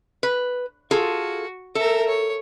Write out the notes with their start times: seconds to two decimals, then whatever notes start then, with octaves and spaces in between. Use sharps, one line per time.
0.23 B4
0.91 F4 F#4 G#4 A4
1.75 A4 A#4 E5
2.08 C#5